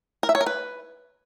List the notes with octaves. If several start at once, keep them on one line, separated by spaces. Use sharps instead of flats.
A#4
E5
C#5
A#4
B4